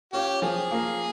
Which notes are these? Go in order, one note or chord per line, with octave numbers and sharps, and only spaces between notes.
C#4 F4 G4
F3 G#4
A#3 F4